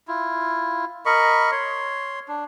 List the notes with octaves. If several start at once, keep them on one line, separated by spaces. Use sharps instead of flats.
E4 F4
A#4 D#5 B5 C#6
C#5 C6
D4